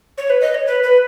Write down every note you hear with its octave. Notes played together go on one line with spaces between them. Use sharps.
C#5
B4
D#5
C#5
B4
B4